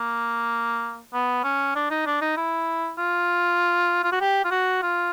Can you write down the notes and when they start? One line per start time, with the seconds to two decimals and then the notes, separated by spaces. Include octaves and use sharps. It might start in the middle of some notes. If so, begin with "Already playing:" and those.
Already playing: A#3
1.14 B3
1.44 C#4
1.75 D4
1.91 D#4
2.06 D4
2.21 D#4
2.37 E4
2.98 F4
4.04 F4
4.12 F#4
4.21 G4
4.45 F4
4.51 F#4
4.83 F4